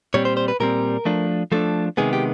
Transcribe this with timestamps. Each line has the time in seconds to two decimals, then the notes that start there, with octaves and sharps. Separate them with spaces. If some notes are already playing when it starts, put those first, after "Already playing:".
0.14 A#2 G3 C4 C#5
0.25 C5
0.37 C5
0.48 B4
0.60 A#2 G3 C4 A#4
1.05 F3 A3 D4
1.52 F3 A3 D4 A4
1.97 C3 D#3 G#3 B3 G#4
2.13 G4